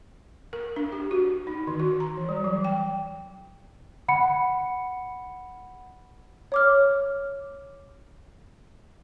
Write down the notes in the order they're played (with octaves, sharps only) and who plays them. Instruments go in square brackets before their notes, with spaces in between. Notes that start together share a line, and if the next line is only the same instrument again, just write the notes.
[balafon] A#4
D4
G4
F#4
D#4
D#3
F#4
A#5
E3
G3
F#3
G5
[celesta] F#5 B5 C#7
[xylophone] C#5 D6 F6